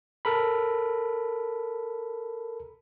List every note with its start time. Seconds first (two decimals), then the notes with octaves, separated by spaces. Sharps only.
0.25 A4 A#4 B5